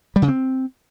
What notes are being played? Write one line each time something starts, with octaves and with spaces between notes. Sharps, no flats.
G3
C#3
C4